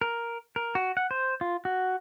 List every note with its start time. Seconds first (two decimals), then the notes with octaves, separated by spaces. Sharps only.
0.01 A#4
0.56 A#4
0.75 F#4
0.97 F#5
1.11 C5
1.41 F4
1.65 F#4